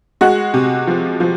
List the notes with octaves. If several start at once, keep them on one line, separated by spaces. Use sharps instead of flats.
G#3 F#4 F#5
C3
F3
F3